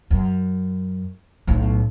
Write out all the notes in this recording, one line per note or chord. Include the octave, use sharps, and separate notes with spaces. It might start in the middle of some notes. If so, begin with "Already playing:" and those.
F#2
B1 A2